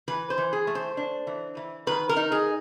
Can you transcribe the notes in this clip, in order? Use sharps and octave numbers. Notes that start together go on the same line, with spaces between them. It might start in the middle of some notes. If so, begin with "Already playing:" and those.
E3 B4
C5
E3
G#4
A3
C5
D4
E3
E3
D#3 B4
A#4
D#4
G#4